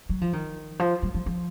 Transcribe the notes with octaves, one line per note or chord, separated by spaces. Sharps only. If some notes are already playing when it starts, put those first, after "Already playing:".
F#3
F3
D#3
F3
F#3
F3
F3